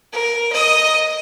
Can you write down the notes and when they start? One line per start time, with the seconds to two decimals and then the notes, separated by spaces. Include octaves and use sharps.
0.13 A#4
0.53 D#5 D#6